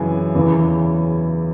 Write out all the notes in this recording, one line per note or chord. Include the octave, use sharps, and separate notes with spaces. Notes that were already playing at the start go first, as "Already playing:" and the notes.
Already playing: F#2 C#3 E3 G#5
E2 C#3 E3